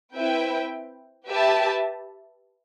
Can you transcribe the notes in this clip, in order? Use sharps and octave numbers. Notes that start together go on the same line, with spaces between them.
C4 E4 B4 E5 G5
G4 B4 E5 A5